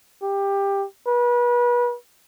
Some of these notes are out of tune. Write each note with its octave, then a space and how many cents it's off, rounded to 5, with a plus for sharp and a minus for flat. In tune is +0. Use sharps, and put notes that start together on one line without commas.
G4 +15
B4 -35